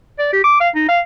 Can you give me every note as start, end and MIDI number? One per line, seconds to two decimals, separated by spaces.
0.19 0.31 74
0.33 0.43 67
0.44 0.60 86
0.61 0.69 77
0.75 0.87 63
0.89 1.01 77